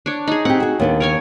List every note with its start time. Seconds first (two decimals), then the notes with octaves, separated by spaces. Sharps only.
0.06 D4 C#5
0.28 D#4 G#4
0.45 C4 G4 F#5
0.60 F#4 G#4
0.80 D#2 B3 D4
1.00 A#4 C#5 G#5